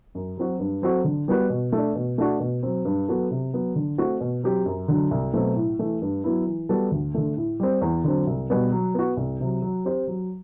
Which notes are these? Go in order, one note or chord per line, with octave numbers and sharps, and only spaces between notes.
F#2
F#3 C4 F#4
G2
F#3 C4 F#4 A4
D3
G3 B3 F#4 B4
B2
A3 D4
B2
A3 D4 F#4
B2
F#3 C4
G2
F#3 B3 F#4 A4
C3
F#3 B3
D3
A3 C4 F#4
B2
F#3 C4 G4 C5
F#2
D3 F#3
C2
B2 F#3 A3 C4
A2
E3 A3
G2
F#3 B3 E4
E3
G3 B3 F#4 A4
D2
D3 A3
A2
G3 C4
E2
D3 F#3 C4
C2
B2 G3 B3
F#3
B3 F#4
C2
C3 F#3
F#3
C4 G4 C5
F#3